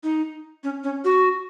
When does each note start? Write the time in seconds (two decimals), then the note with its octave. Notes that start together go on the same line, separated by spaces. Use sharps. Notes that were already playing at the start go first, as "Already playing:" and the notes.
0.04 D#4
0.64 C#4
0.84 C#4
1.04 F#4